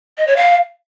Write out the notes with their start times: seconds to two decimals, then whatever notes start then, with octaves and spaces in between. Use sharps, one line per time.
0.18 D#5
0.27 C#5
0.37 F5